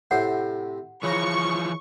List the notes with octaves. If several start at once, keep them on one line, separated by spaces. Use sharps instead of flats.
A2 C3 C5 F#5
C#3 E3 F3 A#5 C#6